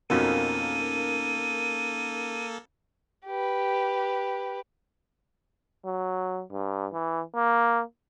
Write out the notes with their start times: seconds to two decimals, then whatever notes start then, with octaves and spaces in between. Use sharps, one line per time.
0.10 F2 B2 A#3 C#4 D#4 A4 A#4 D#7
3.26 G4 B4
5.86 F#3
6.52 G2
6.93 E3
7.35 A#3